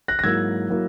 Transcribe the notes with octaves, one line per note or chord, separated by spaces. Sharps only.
F#6 A#6
A#6
G#2 F#3 A#3 E4 E6 G#6
F#3 A#3 E4